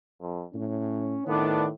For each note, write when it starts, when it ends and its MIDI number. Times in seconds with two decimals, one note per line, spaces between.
0.21 0.44 41
0.54 1.16 45
0.54 1.27 61
1.27 1.70 45
1.27 1.69 51
1.27 1.64 59
1.27 1.64 62